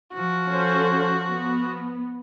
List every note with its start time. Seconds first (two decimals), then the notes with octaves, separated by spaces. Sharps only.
0.14 F3 F#4
0.47 C#4 A4 C5
1.26 B3